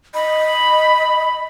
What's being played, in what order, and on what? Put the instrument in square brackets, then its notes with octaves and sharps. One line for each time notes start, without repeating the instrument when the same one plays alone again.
[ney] D#5 [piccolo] B5